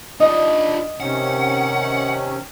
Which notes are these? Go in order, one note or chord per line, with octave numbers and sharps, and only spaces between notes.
D4 D#4 F4 D#5
C3 D#3 C#4 F#5